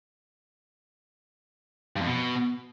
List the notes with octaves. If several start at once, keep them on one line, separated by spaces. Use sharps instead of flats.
G2
F2
B2